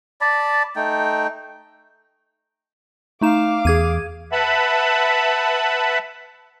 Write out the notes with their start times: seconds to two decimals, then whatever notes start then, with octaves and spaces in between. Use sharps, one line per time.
0.21 D5 A5 B5
0.76 A3 D#4 G5
3.21 A3 D#4 F5 D6 E7
3.65 E2 G#4 G#6 D#7
4.32 B4 E5 F#5 A5 B5